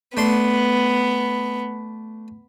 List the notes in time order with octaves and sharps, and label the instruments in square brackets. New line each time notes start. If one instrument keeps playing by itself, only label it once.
[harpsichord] A3 D4 C6 [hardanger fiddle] B3